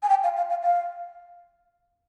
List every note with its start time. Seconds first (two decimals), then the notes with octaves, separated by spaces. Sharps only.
0.03 G#5
0.09 G5
0.24 F5
0.37 F5
0.50 F5
0.62 F5